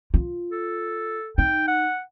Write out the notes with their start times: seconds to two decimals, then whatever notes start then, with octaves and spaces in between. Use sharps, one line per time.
0.14 F4
0.51 A4
1.38 D#4 G5
1.68 F#5